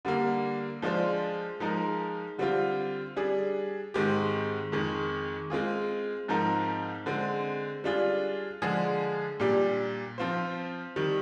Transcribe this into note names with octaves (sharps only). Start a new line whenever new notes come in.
D3 G3 A#3
F3 G#3 D4 F4 C5
F3 G#3 D#4 A#4
D3 G3 C4 F4
G3 D4 G#4
G#2 D#3 G#3 C4 G4
F2 D#3 G#3
G#3 C4 F4 G#4
G#2 F3 C4 D#4 A#4
D3 G#3 C4
G3 D4 F4 G#4
D3 F3 G#3 D4 G#4
A#2 G3 D4 G4
F3 C4 F4 C5
D#3 G3